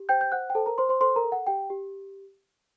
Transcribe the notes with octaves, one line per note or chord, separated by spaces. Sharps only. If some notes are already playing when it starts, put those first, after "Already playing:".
Already playing: G4
C5 G5 G6
G6
C5 F#5 F#6
G5
A4 C5 A5
A#4 A#5
C5 C6
C5 C6
A4 C5 C6
A#4 A#5
A4
F#5
G4 G5
G4